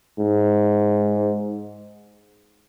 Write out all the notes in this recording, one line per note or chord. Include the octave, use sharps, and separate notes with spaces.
G#2